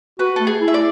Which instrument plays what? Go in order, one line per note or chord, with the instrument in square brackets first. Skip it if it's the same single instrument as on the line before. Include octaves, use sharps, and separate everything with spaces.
[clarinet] F#4 [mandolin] B4
[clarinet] A3 [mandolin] A4
[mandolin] G#4
[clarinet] E4
[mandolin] E5
D5